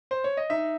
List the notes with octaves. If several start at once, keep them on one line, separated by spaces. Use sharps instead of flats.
C5
C#5
D#5
D#4 E5